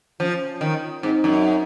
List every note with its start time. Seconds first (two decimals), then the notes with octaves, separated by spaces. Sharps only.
0.20 F3 C#4 F4
0.61 D#3
1.03 G#2 C4 D#4
1.24 F#2